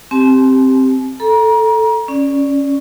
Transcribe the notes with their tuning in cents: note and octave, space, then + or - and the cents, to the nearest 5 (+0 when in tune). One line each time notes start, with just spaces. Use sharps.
C4 +5 G4 +0 A5 -45
A4 +0 A#5 +30
C#4 +0 D5 +0